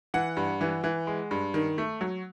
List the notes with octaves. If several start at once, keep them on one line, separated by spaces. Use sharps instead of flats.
E3 F#5
G2
E3
E3
G#3
G2
D#3
A3
F#3